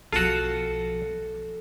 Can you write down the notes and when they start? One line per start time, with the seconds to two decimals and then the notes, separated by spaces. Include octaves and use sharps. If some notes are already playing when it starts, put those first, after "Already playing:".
0.12 B1 F3 F4 F#4 A4